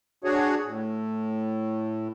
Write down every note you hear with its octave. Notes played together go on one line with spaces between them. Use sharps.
D4 F#4 G#4 C#5
A2